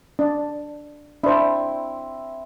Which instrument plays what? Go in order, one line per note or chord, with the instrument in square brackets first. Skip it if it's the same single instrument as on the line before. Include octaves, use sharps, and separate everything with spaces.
[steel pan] D4
[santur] C4 E4 [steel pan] D4 C5